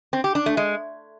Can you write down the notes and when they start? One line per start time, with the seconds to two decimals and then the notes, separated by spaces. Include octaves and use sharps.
0.13 C4
0.24 G4
0.35 D4
0.46 A3
0.57 G#3